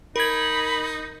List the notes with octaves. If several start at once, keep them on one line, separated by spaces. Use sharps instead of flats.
D#4 A#4 B5 G#6